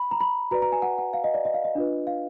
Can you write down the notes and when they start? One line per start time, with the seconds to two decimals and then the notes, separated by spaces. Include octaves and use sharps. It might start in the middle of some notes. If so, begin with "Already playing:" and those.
Already playing: B5
0.11 A#5
0.20 B5
0.51 F#4 B4 D5 A#5
0.62 A#5
0.72 G#5
0.82 F#5
0.98 F#5
1.13 F5
1.24 D#5
1.34 D5
1.45 D#5
1.54 F5
1.64 D#5
1.75 D4 F4 B4
2.07 F5